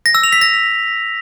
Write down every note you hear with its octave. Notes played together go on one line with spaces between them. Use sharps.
A#6
E6
F7
B6
A#6